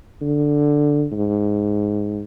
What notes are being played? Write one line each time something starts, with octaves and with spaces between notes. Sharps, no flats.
D3
G#2